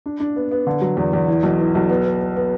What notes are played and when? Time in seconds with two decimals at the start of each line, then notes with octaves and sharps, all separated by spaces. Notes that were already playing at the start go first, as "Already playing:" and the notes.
0.06 D4
0.20 D4
0.36 B3
0.51 B3
0.67 D3
0.81 F#3
0.97 E2
1.13 E2
1.28 E3
1.43 B1
1.59 E3
1.75 B1
1.90 B3
2.06 B3
2.21 B3
2.36 B3